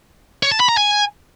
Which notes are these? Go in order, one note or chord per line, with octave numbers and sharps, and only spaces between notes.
C#5
A5
B5
A#5
G#5